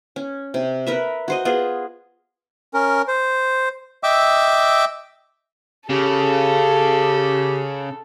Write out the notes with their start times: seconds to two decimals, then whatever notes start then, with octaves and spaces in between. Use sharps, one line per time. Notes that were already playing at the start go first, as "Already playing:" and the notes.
0.16 C#4
0.54 C3
0.87 A#4 B4 E5
1.28 F#4 C5 D#5
1.45 B3 F4 G#4 C5
2.74 C#4 A#4
3.08 C5
4.03 D#5 E5 G5 D6 E6
5.90 C#3 G4 A4